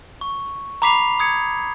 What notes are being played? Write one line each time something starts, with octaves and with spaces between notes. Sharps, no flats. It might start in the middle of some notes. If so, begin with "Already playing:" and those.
C#6
A#5 B5 D6 B6 C7 F7
D#6 G#6 C#7